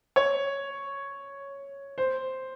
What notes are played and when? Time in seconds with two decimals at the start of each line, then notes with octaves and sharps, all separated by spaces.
0.16 C#5
1.98 C5